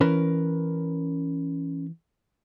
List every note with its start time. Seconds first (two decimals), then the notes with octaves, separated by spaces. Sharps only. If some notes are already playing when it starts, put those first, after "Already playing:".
0.01 E3 C#4 A#4 B4